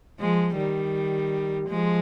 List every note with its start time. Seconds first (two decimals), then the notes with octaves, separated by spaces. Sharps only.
0.20 F3 G#3
0.57 D#3 G3
1.69 F3 G#3